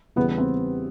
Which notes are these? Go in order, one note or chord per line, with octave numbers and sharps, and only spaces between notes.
E2 C#3 E3 G3 B3
C4